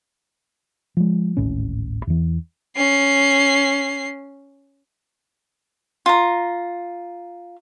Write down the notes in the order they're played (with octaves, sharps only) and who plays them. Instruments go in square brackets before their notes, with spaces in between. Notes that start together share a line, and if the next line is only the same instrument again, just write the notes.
[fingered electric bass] F3 G#3
D1 G#1 A2 C#4
E2 E3
[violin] C#4 C7
[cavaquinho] F4 A#5